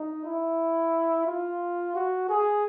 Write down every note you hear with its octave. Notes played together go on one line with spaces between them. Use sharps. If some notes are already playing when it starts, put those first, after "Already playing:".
Already playing: D#4
E4
F4
F#4
G#4